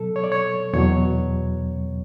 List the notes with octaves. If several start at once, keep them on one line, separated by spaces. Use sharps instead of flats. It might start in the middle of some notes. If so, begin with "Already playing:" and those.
Already playing: B2 F#3 A4
C#5
D5
C#5
E2 B2 F#3 C#5